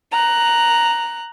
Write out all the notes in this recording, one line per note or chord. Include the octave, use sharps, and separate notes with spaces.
A#5 F#6